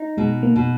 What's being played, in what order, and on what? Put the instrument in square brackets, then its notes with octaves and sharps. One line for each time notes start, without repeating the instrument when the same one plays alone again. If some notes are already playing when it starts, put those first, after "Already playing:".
Already playing: [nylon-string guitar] D#4
[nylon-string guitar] B2 [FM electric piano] G#3
[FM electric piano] A#3
[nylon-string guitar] B2